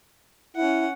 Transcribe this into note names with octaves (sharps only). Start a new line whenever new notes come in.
C#4 E4 F#5